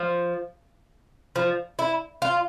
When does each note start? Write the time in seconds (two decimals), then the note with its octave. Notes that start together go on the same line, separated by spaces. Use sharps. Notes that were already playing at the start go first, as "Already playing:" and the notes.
Already playing: F3
1.36 F3
1.79 E4
2.22 F4